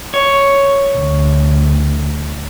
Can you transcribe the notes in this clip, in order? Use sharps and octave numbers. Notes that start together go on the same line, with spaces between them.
C#5
D2